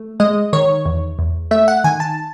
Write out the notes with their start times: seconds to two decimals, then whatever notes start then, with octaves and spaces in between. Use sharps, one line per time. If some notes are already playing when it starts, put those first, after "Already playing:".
Already playing: A3
0.20 G#3 D#5
0.53 D#3 C#5
0.86 E2
1.19 E2
1.51 A3 E5
1.68 F#5
1.84 D#3 G#5
2.00 A5